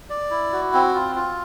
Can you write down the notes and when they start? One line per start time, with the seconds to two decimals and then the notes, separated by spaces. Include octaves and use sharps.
0.10 D5
0.31 E4
0.52 F#4
0.74 C4
0.94 F4
1.16 F4